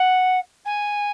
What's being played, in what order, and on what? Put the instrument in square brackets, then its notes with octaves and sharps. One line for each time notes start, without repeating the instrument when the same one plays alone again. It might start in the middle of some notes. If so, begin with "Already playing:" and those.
Already playing: [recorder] F#5
G#5